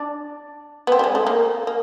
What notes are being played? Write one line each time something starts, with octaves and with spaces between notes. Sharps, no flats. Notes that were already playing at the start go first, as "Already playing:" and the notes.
Already playing: D4
B3
C4
G3
G#3
A3
A#3
A#3